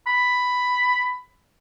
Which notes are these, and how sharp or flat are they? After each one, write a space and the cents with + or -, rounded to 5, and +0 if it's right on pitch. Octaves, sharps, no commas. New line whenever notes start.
B5 +5